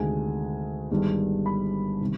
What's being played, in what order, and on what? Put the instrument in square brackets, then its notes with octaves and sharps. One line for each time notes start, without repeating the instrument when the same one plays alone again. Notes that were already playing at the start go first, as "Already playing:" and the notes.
Already playing: [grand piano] D2 C3 D#3 G#3 G#5
G1 G2 D#3 G#3
B5
C3 D#3 G3